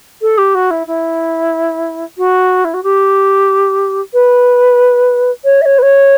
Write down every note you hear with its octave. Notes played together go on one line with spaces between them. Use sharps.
A4
G4
F#4
E4
E4
F#4
E4
F#4
G4
B4
C#5
E5
C#5
B4
C#5